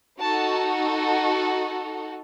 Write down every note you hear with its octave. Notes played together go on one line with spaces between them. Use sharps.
D#4 F#4 A4 A5